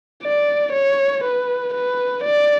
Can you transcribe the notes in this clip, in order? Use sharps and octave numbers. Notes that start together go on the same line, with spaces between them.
D5
C#5
B4
B4
D5